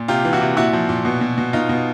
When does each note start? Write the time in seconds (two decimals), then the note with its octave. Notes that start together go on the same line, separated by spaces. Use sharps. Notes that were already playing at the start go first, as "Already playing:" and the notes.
Already playing: A#2
0.08 C3 F4 G4
0.25 E3
0.33 E4 F#4
0.41 C3
0.57 A#2 E4 F#4
0.73 F3
0.89 A#2
1.05 B2
1.21 B2
1.38 B2
1.53 B2 D#4 F4
1.69 B2